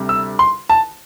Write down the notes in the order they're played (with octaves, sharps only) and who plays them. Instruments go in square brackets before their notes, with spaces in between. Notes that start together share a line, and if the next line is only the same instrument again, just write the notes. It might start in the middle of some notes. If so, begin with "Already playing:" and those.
Already playing: [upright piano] D2 C3 G3
E6
C6
A5